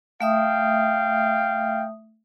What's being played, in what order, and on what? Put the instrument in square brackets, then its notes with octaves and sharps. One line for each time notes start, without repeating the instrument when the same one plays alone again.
[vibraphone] A3 E5 D#6 [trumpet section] F5 G5